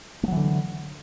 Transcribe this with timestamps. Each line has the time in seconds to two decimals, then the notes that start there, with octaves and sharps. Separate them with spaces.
0.23 A3
0.28 F#3
0.32 E3
0.37 D3